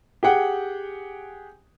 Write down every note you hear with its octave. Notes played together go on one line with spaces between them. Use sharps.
G4 G#4 F#5 G5